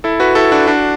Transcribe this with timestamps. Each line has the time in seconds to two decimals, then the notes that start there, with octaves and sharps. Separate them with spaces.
0.04 E4 A4
0.20 F#4 B4
0.35 E4 A4
0.51 D4 F#4
0.67 D4 F#4